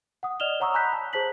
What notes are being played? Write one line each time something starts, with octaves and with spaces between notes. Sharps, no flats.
F#5 D#6
D5 D#5 F6 E7 F7 G7
C#5 F#5 A#5 C#6 D#6 E6
G#5 A#5 B5 F#6 G6 B6
A5
G#4 C5 A5 B6 F#7